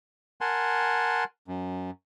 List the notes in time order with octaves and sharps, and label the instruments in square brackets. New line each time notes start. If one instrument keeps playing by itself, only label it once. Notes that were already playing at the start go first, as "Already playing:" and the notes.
[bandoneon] A#4 F#5 G#5 A5 C6
F#2